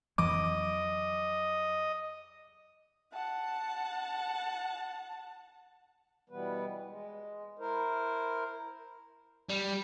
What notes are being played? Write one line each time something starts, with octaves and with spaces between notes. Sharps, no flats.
F2 E3 F#3 D#5 D6
F#5 A5
B2 E3 G3 B3 B4
G#3
E4 A#4 C5
G3